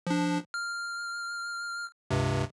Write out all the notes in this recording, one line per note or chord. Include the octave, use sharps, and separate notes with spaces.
F3 D4
F6
C#2 G2 C3